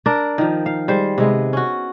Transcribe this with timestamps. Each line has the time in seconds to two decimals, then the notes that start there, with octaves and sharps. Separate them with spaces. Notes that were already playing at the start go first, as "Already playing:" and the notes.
0.06 D4 A#4 D5
0.38 D#3 F3
0.66 F5
0.88 G3 G#3 C5
1.18 C3 G#3 B3
1.53 C#4 F#4